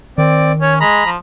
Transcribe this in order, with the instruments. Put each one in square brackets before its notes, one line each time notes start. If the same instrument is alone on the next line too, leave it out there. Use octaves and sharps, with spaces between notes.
[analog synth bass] D#3 [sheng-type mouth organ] C4 D5
[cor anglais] C#4 [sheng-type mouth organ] C#5
[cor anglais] G#3 [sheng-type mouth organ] A#5 B5
[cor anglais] F3